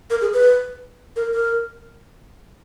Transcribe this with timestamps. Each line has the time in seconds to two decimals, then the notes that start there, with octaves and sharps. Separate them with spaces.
0.10 A#4
0.21 G#4
0.34 B4
1.16 A#4
1.34 A#4